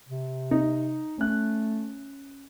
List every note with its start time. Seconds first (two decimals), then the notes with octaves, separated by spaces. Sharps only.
0.09 C3
0.51 D#4
1.18 A3 C#4 F#6